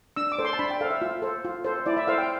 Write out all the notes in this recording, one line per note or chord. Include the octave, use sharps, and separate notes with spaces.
D4 E6
D6
A4 C5
C6
A5
D4 B5
G5
A4 C5 F5
E5
F4
A4 C5
F4
A4 C5
E4 D5
E5
A4 C5 F5
G5